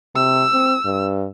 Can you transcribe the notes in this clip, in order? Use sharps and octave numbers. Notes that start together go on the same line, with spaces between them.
C3 E6
C4
G2